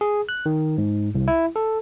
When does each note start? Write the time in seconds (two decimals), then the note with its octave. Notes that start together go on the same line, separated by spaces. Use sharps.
0.01 G#4
0.29 F#6
0.46 D#3
0.78 G#2
1.15 C2
1.28 E4
1.56 A4